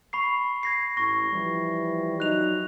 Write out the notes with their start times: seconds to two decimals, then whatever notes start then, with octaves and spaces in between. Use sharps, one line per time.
0.13 B5 C#6 C7
0.63 G#6 A#6 C7
0.97 A1 C#6 A#6
1.31 E3 F3 G3
2.20 F#3 D#4 F#6 F7